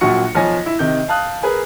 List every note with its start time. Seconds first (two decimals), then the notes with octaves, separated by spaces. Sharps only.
0.01 A#1 A#2 F#3 F#4 C#6 C#7
0.35 B1 F3 C#5 G#5 A#6
0.66 E4
0.79 C3 D#3 G6
1.08 F5 A5 D#6 F#6
1.43 G#4 A#4 B4 G#5